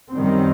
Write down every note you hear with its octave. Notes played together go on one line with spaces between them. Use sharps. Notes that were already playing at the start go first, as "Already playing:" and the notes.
F#2 D#3 G3 C4